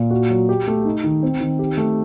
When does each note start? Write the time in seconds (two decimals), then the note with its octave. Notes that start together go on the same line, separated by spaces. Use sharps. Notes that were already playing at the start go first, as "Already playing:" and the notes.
Already playing: A#2
0.11 F#4
0.30 F#3
0.49 G4
0.67 A3
0.85 D#4
1.04 D#3
1.23 C4
1.40 D#3
1.59 G4
1.77 A3